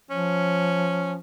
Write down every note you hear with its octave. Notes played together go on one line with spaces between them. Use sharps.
F3 C#4